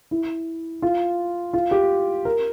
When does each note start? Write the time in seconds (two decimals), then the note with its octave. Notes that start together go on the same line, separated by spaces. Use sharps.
0.11 E4
0.82 F4
1.53 F4
1.71 G4
2.25 A#4